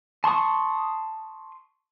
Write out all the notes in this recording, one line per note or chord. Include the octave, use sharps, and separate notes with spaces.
A5 C6 C#6 D#6